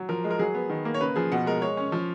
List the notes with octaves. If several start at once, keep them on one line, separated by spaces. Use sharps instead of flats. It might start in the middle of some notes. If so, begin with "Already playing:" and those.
Already playing: F#3
F3 A#4
G#3
A#4
F#3 G#4
B3
D#3
A#3
C#5
C#3 B4
F3 G#4
B2 F#5
G#3 A#4
G#3 C#5
C#4
F3